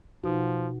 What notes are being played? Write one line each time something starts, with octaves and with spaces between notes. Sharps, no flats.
B2 F3 D#4 F#4